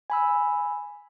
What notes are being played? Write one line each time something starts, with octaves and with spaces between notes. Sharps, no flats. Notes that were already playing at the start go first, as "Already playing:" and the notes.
G#5 B5 E6